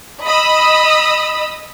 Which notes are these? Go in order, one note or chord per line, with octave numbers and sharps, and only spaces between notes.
D#5 B5 D#6 E6